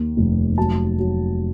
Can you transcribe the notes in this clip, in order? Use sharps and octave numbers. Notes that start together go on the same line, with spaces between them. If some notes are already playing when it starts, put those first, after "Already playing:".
Already playing: D#2
F1
F#3 A5
F#3